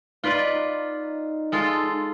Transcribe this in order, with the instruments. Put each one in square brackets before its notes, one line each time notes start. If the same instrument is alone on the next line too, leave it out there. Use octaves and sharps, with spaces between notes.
[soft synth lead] D#4 [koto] F4 B4 D5
[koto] G#3 F4 A4